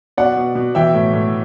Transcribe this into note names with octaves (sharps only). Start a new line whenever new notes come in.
B2 D5 F#5
B2
B2
E3 E5 G5
A2
A2